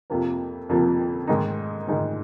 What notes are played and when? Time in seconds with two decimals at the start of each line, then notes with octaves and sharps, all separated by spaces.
0.10 F2 C3 F3 A#3
0.69 F2 C3 F3 A#3
1.27 G#2 D#3 G#3 D#4
1.88 G#2 D#3 G#3 D#4